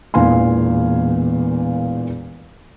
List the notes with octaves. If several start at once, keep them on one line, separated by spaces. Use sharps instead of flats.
E1 E2 A#2 F5 G#5 C6